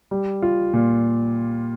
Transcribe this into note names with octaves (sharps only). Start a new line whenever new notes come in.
G3
F4
A#2